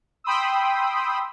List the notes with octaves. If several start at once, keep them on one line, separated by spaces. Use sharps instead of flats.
G5 B5 C6 D#6 E6